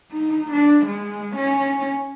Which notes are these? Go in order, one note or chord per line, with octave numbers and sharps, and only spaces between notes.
D#4
D4
G#3
C#4